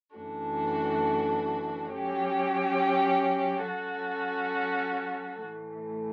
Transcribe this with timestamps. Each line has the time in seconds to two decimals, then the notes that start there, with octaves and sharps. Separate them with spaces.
0.16 F#2 E3 A3 D4 F#4
1.91 F#3 C#4 G4
3.66 F#3 C#4 F#4 A4
5.41 A2 E3 A3